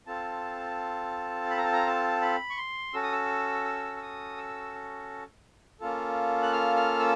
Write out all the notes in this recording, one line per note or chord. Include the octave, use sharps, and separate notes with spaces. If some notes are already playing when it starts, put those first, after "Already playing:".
C4 F4 A4 A5
B5
A#5
A5
A#5
A5
B5
C#6
C6
C#4 F#4 A4 E6
D#6
E6
E6
E6
D#6
E6
A#3 C#4 F4 A4
F#6
F6
F6
E6